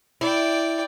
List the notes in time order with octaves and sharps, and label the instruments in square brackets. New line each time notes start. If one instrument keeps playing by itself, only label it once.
[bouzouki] E4 [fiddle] D5 G5